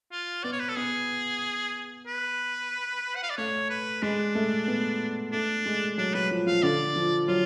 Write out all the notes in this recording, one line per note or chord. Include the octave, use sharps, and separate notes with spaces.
F4
B3 D5
C#5
B4
A4
B3 G#4
B4
F#5
F5
D5
A3 C#5
B4
G#3 D4
A3
B3
A3 D4
G#3
F#3 D4
F#3 B4
F3
F3 F5
D3 D5
F3
F#3 F4